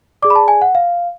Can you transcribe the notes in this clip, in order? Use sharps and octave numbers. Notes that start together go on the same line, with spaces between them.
G#4 D5 D6
B5
A5
G#5
F#5
F5